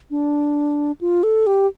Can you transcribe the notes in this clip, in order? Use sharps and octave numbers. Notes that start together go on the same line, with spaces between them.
D4
F4
A4
G4